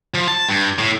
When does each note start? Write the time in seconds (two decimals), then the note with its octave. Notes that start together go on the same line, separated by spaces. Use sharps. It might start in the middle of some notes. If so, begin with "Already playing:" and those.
0.14 F3
0.28 A5
0.49 G2
0.79 A2